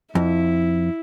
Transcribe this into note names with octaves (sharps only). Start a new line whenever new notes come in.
F2 E4